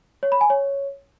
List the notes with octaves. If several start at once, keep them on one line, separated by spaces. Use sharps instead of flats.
C#5
B5
G#5
C#5